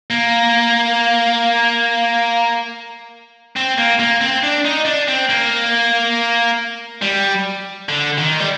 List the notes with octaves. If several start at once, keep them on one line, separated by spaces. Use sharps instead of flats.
A#3
C4
A#3
A#3
C4
D4
D#4
D4
C4
A#3
G3
D3
D#3
G3